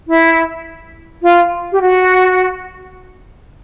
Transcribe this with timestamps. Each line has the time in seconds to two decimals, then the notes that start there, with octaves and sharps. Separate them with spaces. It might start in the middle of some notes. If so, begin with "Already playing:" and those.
0.07 E4
1.22 F4
1.72 G4
1.80 F#4